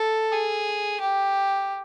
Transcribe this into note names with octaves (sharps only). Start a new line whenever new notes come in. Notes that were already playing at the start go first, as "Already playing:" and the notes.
Already playing: A4
G#4
G4